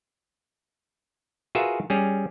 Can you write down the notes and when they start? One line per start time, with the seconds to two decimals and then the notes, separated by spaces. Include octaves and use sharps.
1.55 F4 F#4 G#4 A#4 B4 E5
1.90 G3 C#4 G#4